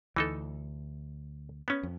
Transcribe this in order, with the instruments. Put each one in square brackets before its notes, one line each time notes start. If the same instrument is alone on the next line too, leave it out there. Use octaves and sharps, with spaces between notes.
[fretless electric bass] D2 [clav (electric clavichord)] E3 D#4 A4
[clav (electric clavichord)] B3 C#4
[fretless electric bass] F2